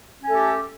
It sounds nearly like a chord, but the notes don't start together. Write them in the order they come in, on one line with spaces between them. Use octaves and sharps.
C#4 A4 A3 G4